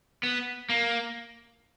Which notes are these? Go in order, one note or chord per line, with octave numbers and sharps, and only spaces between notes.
B3
A#3